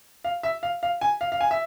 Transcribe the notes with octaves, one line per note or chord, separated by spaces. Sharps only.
F5
E5
F5
F5
G#5
F5
F5
G#5
E5